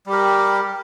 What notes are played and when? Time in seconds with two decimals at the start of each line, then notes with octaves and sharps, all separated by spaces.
0.06 G3
0.09 G4
0.13 A#4